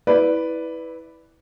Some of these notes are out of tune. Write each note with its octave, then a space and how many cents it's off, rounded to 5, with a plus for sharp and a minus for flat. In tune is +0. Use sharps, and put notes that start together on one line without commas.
E4 -20 B4 +0 D5 -5